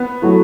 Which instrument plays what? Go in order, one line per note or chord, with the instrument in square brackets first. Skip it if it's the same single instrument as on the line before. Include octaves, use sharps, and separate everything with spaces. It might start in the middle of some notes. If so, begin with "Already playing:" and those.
Already playing: [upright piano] B3
[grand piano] F#3 A3 E4